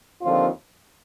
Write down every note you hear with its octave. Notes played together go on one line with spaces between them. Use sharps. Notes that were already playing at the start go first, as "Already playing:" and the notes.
D#2 D3 F3 C4 F4